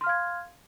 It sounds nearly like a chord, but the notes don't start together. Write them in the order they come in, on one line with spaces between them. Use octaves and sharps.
C6 F6 F5 G#6